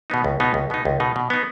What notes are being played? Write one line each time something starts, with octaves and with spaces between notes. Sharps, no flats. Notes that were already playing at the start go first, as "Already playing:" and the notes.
B2 B3 D#4
C#2
B2 B3 D#4
C#2
B2 B3 D#4
C#2
B2 B3 D#4
B2
B3 D#4